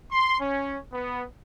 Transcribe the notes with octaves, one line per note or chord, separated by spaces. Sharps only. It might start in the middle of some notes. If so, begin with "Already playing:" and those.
C6
C#4
B3